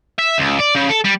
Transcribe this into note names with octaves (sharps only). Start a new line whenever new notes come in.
E5
C#2
D5
C#3
A4
G3